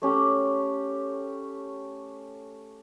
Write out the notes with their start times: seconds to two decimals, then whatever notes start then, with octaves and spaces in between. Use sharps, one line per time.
0.02 A3 C#4 G4